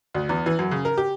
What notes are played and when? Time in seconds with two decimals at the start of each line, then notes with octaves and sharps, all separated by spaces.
0.14 D2
0.29 E2
0.46 E3
0.59 F#2
0.71 C#3
0.85 A#4
0.98 G4